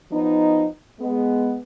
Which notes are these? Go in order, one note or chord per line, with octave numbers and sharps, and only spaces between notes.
F3 B3 D#4
G#3 B3